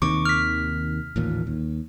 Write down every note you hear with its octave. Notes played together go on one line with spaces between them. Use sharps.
D#2 C3 D#3 C#6 D6
F6 B6
A1 D#2 A#2
D#2